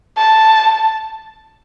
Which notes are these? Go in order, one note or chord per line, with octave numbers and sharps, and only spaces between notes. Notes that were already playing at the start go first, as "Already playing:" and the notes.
A5